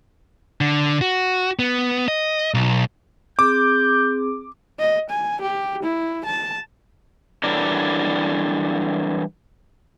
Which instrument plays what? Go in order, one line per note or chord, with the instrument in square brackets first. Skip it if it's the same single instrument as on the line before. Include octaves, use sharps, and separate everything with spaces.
[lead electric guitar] D3
F#4
B3
D#5
B1
[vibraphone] C4 G#4 [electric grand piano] D6 [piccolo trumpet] G6
[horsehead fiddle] D#5
G#5
G4
E4
A5
[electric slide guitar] E3 F#3 G3 D4 A4 A#4